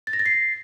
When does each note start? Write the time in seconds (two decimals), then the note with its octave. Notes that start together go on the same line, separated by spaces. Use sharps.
0.07 A6
0.13 A#6
0.19 A6
0.26 C7